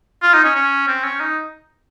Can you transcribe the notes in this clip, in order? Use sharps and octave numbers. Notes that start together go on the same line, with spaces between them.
F4
D#4
C#4
C#4
C4
C#4
D#4